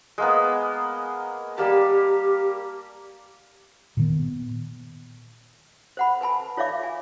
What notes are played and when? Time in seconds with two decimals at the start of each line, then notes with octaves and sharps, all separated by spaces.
0.18 G#3 A#3 B3
1.58 G3 A#3 G4 A5
3.97 A#2 D#3 B3
5.97 C5 F#5 B5
6.21 B4 G#5 A5 B5
6.57 F4 C#5 D5 E5 F5 D6
6.83 G#5